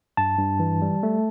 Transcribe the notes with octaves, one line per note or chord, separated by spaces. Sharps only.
G2 A5
G2
E3
G3
A3